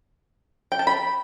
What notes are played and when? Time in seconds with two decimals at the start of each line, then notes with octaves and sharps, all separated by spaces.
0.72 G5
0.79 A5
0.87 B5